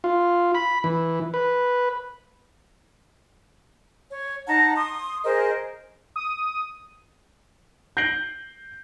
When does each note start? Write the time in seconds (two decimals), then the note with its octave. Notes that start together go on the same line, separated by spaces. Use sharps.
0.04 F4
0.55 B5
0.84 E3
1.34 B4
4.11 C#5
4.47 D#4 F#5 A5 A#5
4.76 C6 D#6
5.25 G#4 A#4 C5 D#5
6.16 D#6
7.97 G6 A#6 C7 D7 F#7 G7